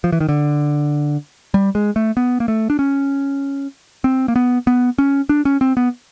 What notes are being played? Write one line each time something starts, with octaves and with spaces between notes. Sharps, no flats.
F3
E3
D#3
D3
G3
G#3
A3
B3
A#3
A3
D4
C#4
C4
A#3
B3
B3
C#4
D4
C#4
C4
B3